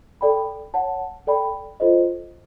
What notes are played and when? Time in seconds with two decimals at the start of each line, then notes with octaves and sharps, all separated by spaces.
0.21 A4 D5 G5 B5
0.74 C#5 F#5 A5
1.27 A4 D5 G5 B5
1.80 F4 A4 C5 D#5